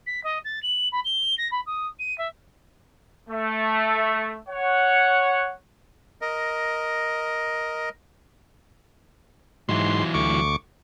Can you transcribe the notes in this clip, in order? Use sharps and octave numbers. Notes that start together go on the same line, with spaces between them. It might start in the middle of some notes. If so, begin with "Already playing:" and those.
B6
D#5
A6
F#7
B5
G7
A#6
B5
D#6
D#7
E5
A3
C#5 F#5
A#4 D#5
G#2 E3 F#3 C6
D2 C#6 D6